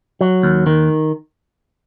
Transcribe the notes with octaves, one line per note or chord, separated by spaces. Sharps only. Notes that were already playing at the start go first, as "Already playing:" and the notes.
F#3
D#2
D#3